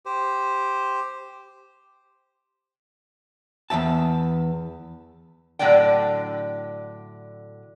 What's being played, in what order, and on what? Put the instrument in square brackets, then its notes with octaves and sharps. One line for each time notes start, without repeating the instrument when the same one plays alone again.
[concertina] G4 C5
[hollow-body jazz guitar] E2 G#2 E5 A5
[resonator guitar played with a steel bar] A2 D3 F#3 D4 D5 G5